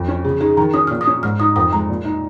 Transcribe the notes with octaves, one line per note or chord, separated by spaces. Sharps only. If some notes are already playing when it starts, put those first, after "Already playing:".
Already playing: F2
C#4
C#3 G#4
D#4 G#4
D#3 A#5
C#4 D#6
A#2 F6
D#6
C#4
G#2 F6
D#4 D#6
F2 D#6
G#3 A#5
A#2
D#4